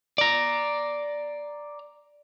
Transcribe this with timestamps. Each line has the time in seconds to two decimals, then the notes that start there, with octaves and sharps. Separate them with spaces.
0.18 D5 A#5